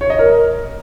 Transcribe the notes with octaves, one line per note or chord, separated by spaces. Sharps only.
C#5
D#5
A#4